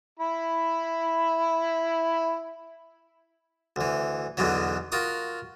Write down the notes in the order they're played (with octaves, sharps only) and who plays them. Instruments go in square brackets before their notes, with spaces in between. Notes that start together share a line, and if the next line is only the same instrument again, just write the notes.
[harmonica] E4 B5
[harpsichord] D2 E3
B1 E2 B2 D3 E3 F#3
F4 F#4 A#4 D#6